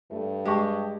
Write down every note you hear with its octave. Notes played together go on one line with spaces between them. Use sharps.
G2 A3
G#3 G4 D#5 G5 A5 C#6